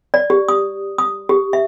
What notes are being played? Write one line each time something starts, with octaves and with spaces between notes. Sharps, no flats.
D5
G4
D#6
D#6
G4
E5